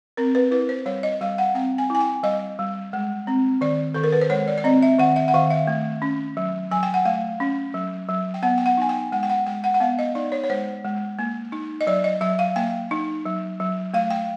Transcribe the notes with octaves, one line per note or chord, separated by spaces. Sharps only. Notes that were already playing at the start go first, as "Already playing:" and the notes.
C4 A#4
B4
E4 B4
C5
G3 C#5
D#5
G3 F5
F#5
C4 G5
G#5
E4 G#5
G5
G3 D#5
G3
G#3
C4
D#3 D5
D#3 A4
A#4
B4
C5
G#3 C#5
D5
D5
C4 D#5
E5
D#3 F#5
E5
F#5
D#3 F5
E5
A3
C#4
F#3
F#3 G#5
G5
F#5
A3 F5
C#4
F#3
F#3
G5
B3 F#5
G5
F#5
D#4 G#5
G5
G#3 F#5
G5
F#5
G#3 G5
F#5
F#5
B3 F5
D#5
D#4 D5
C#5
C#5
G#3 C5
G#3
A#3
D#4
D#5
F#3 D5
D#5
F#3 E5
F5
A#3 G5
D#4
F#3
F#3
A3 F5
G5